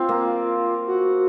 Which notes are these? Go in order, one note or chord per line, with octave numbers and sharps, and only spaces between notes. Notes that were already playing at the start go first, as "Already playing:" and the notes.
Already playing: C4 F4
A#3
F#4